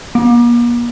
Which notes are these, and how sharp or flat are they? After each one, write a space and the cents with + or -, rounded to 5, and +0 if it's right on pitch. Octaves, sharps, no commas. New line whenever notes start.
A#3 +40